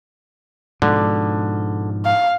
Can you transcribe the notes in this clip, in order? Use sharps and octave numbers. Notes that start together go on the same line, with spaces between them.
G#2 B2 D3 F3
F5